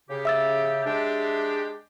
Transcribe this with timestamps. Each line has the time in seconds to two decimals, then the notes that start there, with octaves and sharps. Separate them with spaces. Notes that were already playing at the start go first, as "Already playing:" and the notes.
0.10 C#3 G4
0.25 E5 E6 A6
0.86 G#3 D4 G4